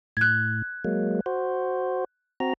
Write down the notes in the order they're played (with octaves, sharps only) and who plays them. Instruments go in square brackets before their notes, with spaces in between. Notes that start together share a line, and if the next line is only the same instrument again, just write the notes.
[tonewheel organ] A2 [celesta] F#6 G#6
[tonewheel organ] F#3 G#3 A#3
F#4 C5
C4 F#4 A#5